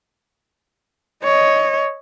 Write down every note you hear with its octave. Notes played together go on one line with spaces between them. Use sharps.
C#5 D#5